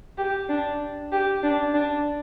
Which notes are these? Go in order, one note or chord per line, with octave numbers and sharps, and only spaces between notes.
G4
D4
G4
D4
D4